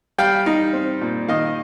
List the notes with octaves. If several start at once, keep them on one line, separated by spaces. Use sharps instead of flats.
G3 F5 G5
D#4
C4
A#2
D#3 D#5 F5